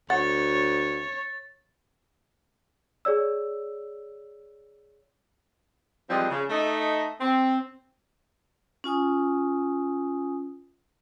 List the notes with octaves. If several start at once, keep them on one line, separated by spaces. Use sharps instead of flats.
D2 C#5 F#5 A6
G#4 C#5 D5 E6
E3 F3 G3 G#3 C4 D#5
C#3
A3 D#4 D#5
C4
C#4 F4 G#5 D#6